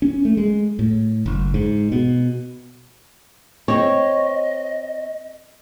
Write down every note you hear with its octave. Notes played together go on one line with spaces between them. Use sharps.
C#4
A3
G#3
A2
F#1
G#2
B2
C4 C#5 D#5